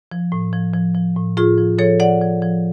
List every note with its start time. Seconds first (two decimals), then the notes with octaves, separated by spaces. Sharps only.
0.12 F3
0.32 A2
0.53 F3
0.73 F3
0.95 F3
1.17 A2
1.37 A2 F4 G#4
1.58 F3
1.79 F3 A4 C#5
2.00 F3 D5 F#5
2.22 F3
2.42 F3